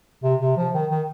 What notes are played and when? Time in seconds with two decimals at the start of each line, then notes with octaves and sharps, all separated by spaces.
0.23 C3
0.41 C3
0.57 F3
0.74 D#3
0.90 D#3